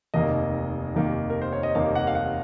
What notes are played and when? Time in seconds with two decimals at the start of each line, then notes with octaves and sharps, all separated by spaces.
0.14 F1 D#2 D#3 A#3 D#5
0.95 F1 D#2 D#3 A#3
1.30 A#4
1.41 C5
1.53 C#5
1.63 D#5
1.75 F1 D#2 D#3 A#3 F5
1.95 F#5
2.07 F5
2.15 F#5